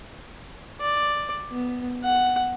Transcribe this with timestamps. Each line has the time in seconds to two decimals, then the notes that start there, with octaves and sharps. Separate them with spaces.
0.81 D5
1.51 B3
2.04 F#5